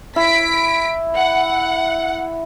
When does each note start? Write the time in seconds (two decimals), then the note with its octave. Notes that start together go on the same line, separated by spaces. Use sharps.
0.16 E4 B6 D7
1.17 F#5